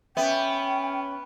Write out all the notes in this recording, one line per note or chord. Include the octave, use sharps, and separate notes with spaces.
B3 C#4 E5 G5